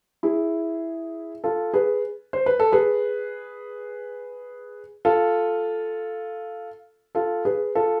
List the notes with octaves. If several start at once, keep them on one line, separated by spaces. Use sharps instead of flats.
E4 G#4
F4 A4
G#4 B4
C5
B4
A4
G#4 B4
F4 A4
F4 A4
G#4 B4
F4 A4